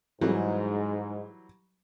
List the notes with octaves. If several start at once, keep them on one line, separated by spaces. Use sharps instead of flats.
G#2 E3 F#3 G3